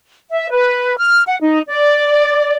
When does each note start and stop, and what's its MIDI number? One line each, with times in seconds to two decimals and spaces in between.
0.30 0.51 76
0.51 0.95 71
0.98 1.23 89
1.27 1.36 78
1.41 1.60 63
1.68 2.56 74